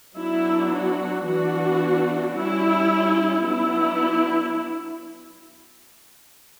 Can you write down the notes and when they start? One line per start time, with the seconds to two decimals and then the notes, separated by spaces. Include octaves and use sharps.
0.17 F#3 B3 D4 E4
0.72 F#4
1.27 E3 B3 D4 F#4
2.36 G3 C#4 E4
3.46 F#3 B3 D4 E4